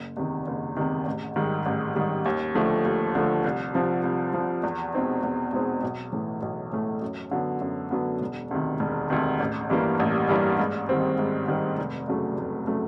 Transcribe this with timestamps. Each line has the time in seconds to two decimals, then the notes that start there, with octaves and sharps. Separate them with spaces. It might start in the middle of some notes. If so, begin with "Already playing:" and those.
Already playing: F#1
0.17 E2 C3 D#3
0.47 F#1
0.77 E2 C3 D#3
1.06 A1
1.36 G#2 D#3 G3
1.66 A1
1.95 G#2 D#3 G3
2.26 D#2
2.55 D3 F3 A3
2.85 D#2
3.15 D3 F3 A3
3.44 C2
3.74 C3 F3
4.04 C2
4.34 C3 F3
4.63 E2
4.94 B2 G#3 C4 D#4
5.24 E2
5.53 B2 G#3 C4 D#4
5.82 B1
6.12 A2 E3 A3
6.42 B1
6.72 A2 E3 A3
7.02 F#2
7.31 D3 F#3 B3
7.62 F#2
7.91 D3 F#3 B3
8.21 E1
8.51 D2 C3 D#3
8.80 E1
9.10 D2 C3 D#3
9.40 A1
9.70 G2 E3 G3 A#3
10.00 A1
10.29 G2 E3 G3 A#3
10.59 G#2
10.89 D#3 G3 C4
11.19 G#2
11.48 D#3 G3 C4
11.78 F1
12.08 E2 C#3 F#3 A3
12.38 F1
12.67 C#3 F#3 A3